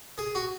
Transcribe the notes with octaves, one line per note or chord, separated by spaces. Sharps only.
G#4
F#4